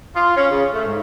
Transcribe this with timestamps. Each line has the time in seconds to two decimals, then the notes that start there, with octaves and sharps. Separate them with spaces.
0.16 F4
0.37 C#4
0.51 C#3
0.72 A3
0.85 G#2